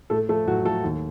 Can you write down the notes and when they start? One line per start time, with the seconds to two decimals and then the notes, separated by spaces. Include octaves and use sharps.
0.10 A2 A3 A4
0.29 F3 A3 A4
0.46 A2 F#3 F#4
0.65 F3 A3 A4
0.84 D#2